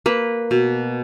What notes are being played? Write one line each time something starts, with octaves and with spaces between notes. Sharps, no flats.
A#3 B4
B2